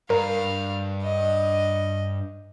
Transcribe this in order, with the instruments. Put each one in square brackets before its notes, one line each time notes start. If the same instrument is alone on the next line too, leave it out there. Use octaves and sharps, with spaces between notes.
[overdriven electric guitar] G2 [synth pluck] A#4 [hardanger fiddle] F5
[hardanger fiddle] D#5